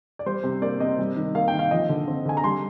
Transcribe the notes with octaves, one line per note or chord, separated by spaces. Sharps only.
D5
G3 C5
C3
A#3 D5
C3 D#5
G3
D#3
A#3 F5
G5
D#3
F5
F3 D#5
D3
C4
D3 G#5
A#5
G3 C6